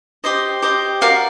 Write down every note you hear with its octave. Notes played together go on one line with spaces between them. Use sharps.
G4 C5 D#5
G4 C5 D#5
F#4 A#4 D5 F5